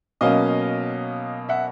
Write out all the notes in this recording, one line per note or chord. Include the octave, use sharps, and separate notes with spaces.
B2 F#3 A#3 C#4 D#5 F5
E5 F#5